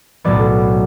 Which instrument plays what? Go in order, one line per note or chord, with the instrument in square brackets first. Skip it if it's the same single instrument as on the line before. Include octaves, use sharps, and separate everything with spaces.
[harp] B1 A2 F#3 B3 D5